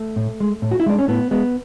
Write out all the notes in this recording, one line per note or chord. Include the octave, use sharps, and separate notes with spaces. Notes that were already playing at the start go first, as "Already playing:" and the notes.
Already playing: A3
A2
G#3
A2
F#4
E4
G#3 D4
C#4
A2 B3
G#3 B3